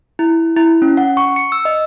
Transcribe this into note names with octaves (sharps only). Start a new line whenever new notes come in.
E4
E4
C#4
F#5
C#6
C#7
E6
D#5